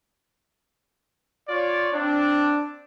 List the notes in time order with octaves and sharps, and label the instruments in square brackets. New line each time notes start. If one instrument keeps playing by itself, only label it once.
[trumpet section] F4 C#5 D5
C4 D4